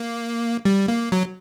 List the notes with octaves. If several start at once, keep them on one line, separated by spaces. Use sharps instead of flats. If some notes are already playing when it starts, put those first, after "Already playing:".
Already playing: A#3
G3
A#3
F#3